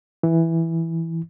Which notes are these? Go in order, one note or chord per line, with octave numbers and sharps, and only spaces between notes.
E3